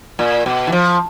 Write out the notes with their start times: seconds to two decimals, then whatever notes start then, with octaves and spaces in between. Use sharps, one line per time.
0.19 A#2
0.46 B2
0.67 E3
0.72 F3